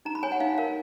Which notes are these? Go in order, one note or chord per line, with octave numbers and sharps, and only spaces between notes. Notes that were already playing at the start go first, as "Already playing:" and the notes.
D#4 A#5
B5
C#5 G#5
F#5
D#4 F5
A#4 F5